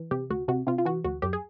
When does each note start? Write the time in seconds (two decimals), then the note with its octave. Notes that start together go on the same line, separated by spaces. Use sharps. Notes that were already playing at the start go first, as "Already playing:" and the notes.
Already playing: E3
0.11 C3 G4
0.30 D2 F#4
0.48 C3 F#4
0.67 C3 F4
0.78 F4
0.85 E3 F#4
1.05 D2 F#4
1.22 F#2 G4
1.33 G#4